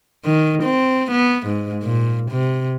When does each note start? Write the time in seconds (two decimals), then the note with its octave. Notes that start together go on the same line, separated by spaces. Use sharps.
0.25 D#3
0.63 C4
1.11 B3
1.47 G#2
1.83 A#2
2.31 C3